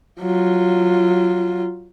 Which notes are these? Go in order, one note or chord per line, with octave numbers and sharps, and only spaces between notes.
F#3 F4